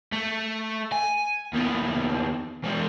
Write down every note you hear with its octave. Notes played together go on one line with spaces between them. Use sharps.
A3
G#5
D#2 B3
E3 G#3